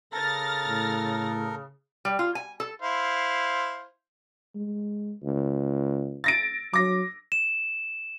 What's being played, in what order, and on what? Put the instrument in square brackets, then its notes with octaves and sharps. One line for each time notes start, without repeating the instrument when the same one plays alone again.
[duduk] C#3 [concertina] A4 A#4 [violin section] F6 A6 A#6
[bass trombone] A2
[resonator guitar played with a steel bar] G3
F4
G#5
A4
[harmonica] E4 C5 F5
[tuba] G#3
C#2
[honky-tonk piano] A6 A#6 D7
[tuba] F#3 [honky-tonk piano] D6 A#6
[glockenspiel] E7